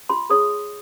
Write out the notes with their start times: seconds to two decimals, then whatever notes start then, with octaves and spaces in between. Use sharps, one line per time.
0.09 F4 C6
0.30 G#4 C#5 D#6